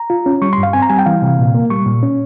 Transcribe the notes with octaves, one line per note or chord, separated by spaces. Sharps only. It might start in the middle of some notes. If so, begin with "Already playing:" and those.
Already playing: A#5
F4
C#4
G3 C#6
C6
G2
F5
C4 G#5
A#5
G3 G#5
G5
E3 F5
C3
A#2
A#3
G3 C#6
A#2
C#4